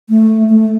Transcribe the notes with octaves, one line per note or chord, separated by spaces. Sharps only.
A3
A3